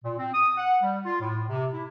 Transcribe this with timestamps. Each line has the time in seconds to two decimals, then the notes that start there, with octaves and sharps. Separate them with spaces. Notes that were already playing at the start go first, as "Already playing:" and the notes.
0.04 A#2
0.18 C4
0.34 D#6
0.57 F#5
0.83 G3
1.05 F4
1.21 A2
1.50 C3
1.74 E4